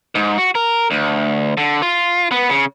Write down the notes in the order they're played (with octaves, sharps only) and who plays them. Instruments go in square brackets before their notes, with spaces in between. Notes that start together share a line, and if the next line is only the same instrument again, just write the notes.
[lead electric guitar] G#2
F#4
A#4
D2
D3
F4
B3
C#3